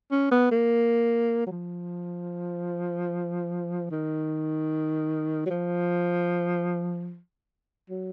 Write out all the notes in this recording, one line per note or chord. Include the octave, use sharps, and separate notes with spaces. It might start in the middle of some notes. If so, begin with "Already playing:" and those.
C#4
B3
A#3
F#3
F3
D#3
F#3
F3
F#3